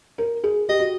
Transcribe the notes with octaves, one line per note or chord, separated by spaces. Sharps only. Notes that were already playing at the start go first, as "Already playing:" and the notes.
A#4
G#4
G4 D#5
F#4